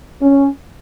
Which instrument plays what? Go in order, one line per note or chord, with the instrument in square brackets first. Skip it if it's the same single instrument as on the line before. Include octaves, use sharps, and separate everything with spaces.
[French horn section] C#4